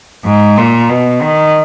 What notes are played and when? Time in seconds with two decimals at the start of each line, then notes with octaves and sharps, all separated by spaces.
0.24 G#2
0.57 A#2
0.89 B2
1.22 D#3